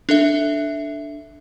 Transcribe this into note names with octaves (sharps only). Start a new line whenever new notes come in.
D4 A4 E5